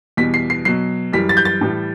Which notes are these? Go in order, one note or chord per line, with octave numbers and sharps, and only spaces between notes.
E2 B2 G3 B6
C7
C7
B2 F#3 C7
F#2 E3 G3 B6
A6
G6
A6
A2 E3 G3